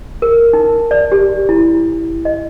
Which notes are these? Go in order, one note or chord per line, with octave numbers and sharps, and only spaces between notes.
A#4
D#4
D5
G4
E4
D#5